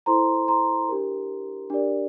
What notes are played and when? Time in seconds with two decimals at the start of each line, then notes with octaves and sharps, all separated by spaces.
0.06 E4 A4 C5 A#5 C6
0.48 A#5 C6
0.89 D4 G4 A#4
1.70 D4 G4 A#4 D5